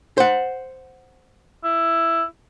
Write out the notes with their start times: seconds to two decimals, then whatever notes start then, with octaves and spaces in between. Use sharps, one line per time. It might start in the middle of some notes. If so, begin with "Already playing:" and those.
0.18 C5 F#5
1.64 E4